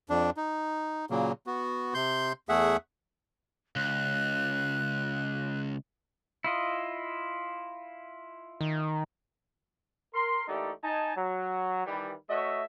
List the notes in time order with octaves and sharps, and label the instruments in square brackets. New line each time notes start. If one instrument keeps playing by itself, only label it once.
[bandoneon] F2 D4
D#4
A#2 C#3 F#3 A#3
B3 F#4
C3 C6 G6
E2 A3 G#4 E5 F#5
[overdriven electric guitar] C#2 [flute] F#6
[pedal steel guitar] E4 F4 D#5
[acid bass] D#3
[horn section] A#4 C6
E3 A3 A#3 D#4 G4 D5
D#4 G#5 A5
F#3
D#3 E3 G3
A3 F#4 C#5 D#5 E5